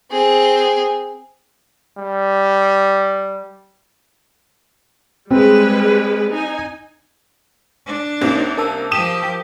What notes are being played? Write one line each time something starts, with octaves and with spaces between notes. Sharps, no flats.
C4 G#4
G3
G3 G#3 C4 B4
D#4 G#5
D4
C2 C3 A#3 C#4 D#4
A#4 A5 E6
F3 G4 D#6 D#7 E7